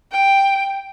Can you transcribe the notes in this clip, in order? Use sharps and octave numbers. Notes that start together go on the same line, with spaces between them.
G5